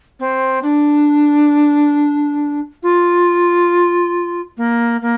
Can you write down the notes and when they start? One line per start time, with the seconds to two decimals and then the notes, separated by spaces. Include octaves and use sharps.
0.20 C4
0.63 D4
2.83 F4
4.57 A#3
5.02 A#3